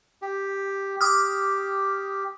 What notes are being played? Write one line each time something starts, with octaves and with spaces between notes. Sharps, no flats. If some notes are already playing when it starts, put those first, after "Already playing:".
G4
G4 D6 D#6 F6